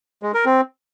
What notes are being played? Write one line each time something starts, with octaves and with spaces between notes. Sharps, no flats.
G#3
A#4
C4